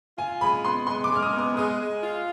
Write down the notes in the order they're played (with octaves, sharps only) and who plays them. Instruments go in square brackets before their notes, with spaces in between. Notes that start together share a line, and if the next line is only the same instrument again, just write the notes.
[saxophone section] F4 [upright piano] G#5
[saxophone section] G#3 [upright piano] B5
[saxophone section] B3 [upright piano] C6
[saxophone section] G#3 [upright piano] C6
[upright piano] D6
[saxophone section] G#3 [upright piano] F6
[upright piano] D#6
[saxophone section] B3
[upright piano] D#6
[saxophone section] G#3 [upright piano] D#6
[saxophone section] G#3
F4